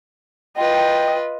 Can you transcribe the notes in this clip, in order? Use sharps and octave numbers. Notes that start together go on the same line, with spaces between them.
F4 B4 D#5 G5